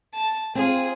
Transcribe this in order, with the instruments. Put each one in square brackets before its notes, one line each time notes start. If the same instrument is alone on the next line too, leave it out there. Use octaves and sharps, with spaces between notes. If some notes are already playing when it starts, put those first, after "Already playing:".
[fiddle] A5
[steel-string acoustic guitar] C4 [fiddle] F4 G#4